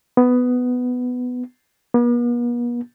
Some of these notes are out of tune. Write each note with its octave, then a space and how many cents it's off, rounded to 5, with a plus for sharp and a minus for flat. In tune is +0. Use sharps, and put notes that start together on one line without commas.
B3 +10
B3 -45